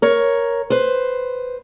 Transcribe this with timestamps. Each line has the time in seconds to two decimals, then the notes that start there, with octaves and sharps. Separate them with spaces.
0.02 A#4 C#5
0.70 B4 C5